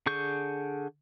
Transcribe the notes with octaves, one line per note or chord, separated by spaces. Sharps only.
D3 G#4 C#6 G6